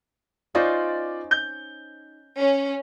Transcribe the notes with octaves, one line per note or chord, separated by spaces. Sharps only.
C#4 D#4 F4 C5 D5
G6
C#4